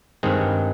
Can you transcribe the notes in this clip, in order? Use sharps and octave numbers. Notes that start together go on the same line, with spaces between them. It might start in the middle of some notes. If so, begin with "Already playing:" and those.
G2 D#3 G#3 C4